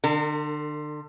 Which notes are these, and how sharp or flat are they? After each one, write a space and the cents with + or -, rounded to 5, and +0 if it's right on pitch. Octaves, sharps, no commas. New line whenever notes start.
D3 +35 A#4 -35